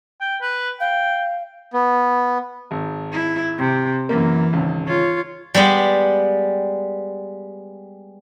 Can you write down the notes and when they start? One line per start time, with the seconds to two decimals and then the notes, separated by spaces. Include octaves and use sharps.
0.21 G5
0.41 B4
0.80 F5 G5
1.73 B3
2.71 G#1
3.13 E4
3.58 C3
4.09 F#2 E3 A#3
4.53 G#1 C#2
4.87 F4 C#5
5.54 G3 G#3 B3 G4